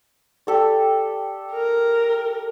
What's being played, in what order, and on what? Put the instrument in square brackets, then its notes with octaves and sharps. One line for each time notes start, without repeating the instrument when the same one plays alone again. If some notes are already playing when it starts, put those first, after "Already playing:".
[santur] G4 A4 D5
[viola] A#4